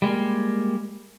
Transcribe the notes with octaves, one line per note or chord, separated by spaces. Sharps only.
G3 G#3 A#3